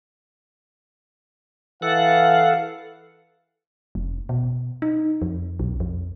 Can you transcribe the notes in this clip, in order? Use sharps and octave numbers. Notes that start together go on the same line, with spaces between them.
E3 A4 F5 F#5
F1
B2
D#4
F2
B1
F2